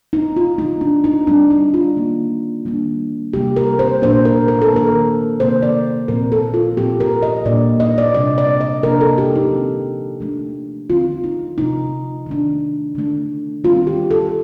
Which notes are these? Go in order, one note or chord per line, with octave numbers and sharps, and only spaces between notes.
D#4
F4
D3 F3 A3 D#4
D4
D#4
D3 G3 C4 D4
D#4
F4
D#3 G3 A#3
D#3 G3 A#3 D4
C3 G3 A#3 G4
A#4
C5
A#2 F3 A#3 D4 C5
A#4
A#4
A4
D#3 A#3 D4 A#4
C3 D#3 A#3 C5
D5
A#2 F3 C4 A#4
A4
F4
A#2 F3 C4 G4
A#4
D#5
A#2 G3 A#3 D4 D5
D#5
D5
C3 G3 D4 D5
D5
D#5
C3 F3 A#3 D4 A#4
A4
G4
D#4
F3 C4
F3 A3 D4
D3 F3 C4 F4
D#4
C3 F3 A3 D#4
D#3 A3 D4
D3 A3 D4
D#3 G3 C4 F4
G4
A4